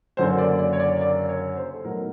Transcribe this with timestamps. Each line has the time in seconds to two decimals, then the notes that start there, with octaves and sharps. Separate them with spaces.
0.17 F#1 F#2 D3 F#3 A#3 C5
0.38 D5
0.59 D5
0.73 C#5
0.79 D5
1.01 D5
1.29 C#5
1.56 C5
1.74 A4
1.84 A2 F#3 B3 D#4 A#4